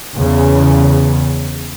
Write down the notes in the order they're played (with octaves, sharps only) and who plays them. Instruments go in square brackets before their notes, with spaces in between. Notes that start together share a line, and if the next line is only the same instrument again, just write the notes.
[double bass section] E2 C#3